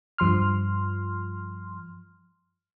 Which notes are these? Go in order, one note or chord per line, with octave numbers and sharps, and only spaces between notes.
G2 F3 C6 F6